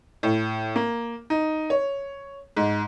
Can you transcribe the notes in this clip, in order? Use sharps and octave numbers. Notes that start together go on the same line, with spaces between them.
A2
A#3
D#4
C#5
G#2